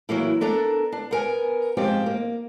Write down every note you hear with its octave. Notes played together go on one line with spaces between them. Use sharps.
E3 F#3 A#3 E4
B3 D4 A4 A#4 A#5
D4
B3 A#4 G#5
G#2 F3 C4 F4 G4
A#3